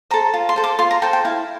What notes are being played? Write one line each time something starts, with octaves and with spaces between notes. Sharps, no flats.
A4 C5 A#5
F4
C6
A4 C5
D6
F4 C6
A#5
A4 C5 G5
G5
E4 F5